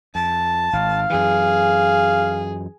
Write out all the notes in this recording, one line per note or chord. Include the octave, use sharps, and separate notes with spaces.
F2 A5
G#1 F5
F#2 E3 G#4